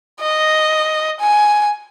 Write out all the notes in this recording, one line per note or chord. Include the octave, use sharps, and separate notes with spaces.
D#5
G#5